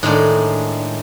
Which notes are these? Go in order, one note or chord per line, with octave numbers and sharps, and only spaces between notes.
A2 D#3 G#3 D4